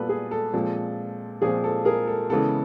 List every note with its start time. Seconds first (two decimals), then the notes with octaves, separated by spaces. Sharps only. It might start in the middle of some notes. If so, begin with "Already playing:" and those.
Already playing: A#2 G3 B3 A4 B4
0.09 G#4
0.31 A4
0.53 A#2 F3 G#3 C4
1.42 A#2 F3 G#3 C4 G#4
1.64 A4
1.85 G#4 A#4
2.07 A4
2.30 C#3 E3 G#3 B3 A4